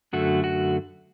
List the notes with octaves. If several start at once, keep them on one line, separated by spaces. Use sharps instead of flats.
F#2 D3 A3 F#4
F#4